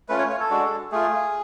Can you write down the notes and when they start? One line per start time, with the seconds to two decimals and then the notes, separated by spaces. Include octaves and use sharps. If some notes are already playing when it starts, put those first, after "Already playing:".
0.09 A3 C#4 F4 B4
0.19 C#5
0.29 C#5
0.40 A4
0.51 G#3 D4 F#4
0.92 A3 F4 G#4